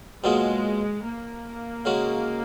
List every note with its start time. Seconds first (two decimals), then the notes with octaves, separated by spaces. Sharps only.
0.24 B2 F#3 G#3 A#3 F4 G#4
1.04 A#3
1.85 C#3 G#3 C#4 F#4 A#4